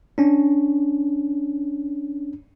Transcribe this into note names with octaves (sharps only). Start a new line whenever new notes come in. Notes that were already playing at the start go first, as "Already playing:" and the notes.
C#4 D4